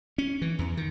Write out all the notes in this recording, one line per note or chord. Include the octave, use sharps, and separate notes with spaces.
C#4
E3
E2
D#3